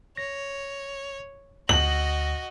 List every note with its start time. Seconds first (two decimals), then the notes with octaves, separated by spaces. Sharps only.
0.17 C#5 A#6
1.69 D2 F#4 D#5 F#7